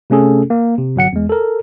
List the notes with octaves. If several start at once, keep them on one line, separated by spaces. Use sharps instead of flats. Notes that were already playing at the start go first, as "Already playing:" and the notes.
C3 A3 C#4 G#4 A4
A#3
C3
G1 F#3 F#5 C#7
E2 G#3
A4 A#4